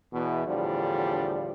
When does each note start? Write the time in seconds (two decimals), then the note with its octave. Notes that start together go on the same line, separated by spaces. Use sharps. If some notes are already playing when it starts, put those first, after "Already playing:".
0.13 E2 B2 E3
0.47 E2 A2 D3 F3 G3 D4